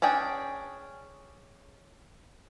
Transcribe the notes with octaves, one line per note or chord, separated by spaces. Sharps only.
C#4 D4 G#4 G5